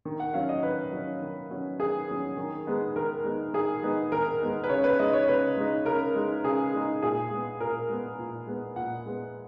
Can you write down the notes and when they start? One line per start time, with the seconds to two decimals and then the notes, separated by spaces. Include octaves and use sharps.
0.05 D#3
0.20 F#5
0.34 F#3 C#4 F5
0.49 D#5
0.63 D#3 B4
0.92 F#3 C#4
1.22 D#3
1.50 F#3 C#4
1.79 D#3 G#4
2.08 F#3 C#4
2.37 D#3
2.66 G#3 B3 D#4
2.96 D#3 A#4
3.24 G#3 B3 D#4
3.53 D#3 G#4
3.83 G#3 B3 D#4
4.12 D#3 A#4
4.41 G#3 B3 D#4
4.64 B4
4.69 C#3 C#5
4.84 B4
4.99 G#3 D#4 D#5
5.13 C#5
5.28 C#3 B4
5.57 G#3 D#4
5.86 C#3 A#4
6.15 G#3 D#4
6.44 C#3 G#4
6.74 G#3 D#4
7.02 A#2 G#4
7.31 G#3 B3
7.60 A#2 A#4
7.90 G#3 B3
8.19 A#2
8.47 G#3 B3
8.76 A#2 F#5
9.06 G#3 B3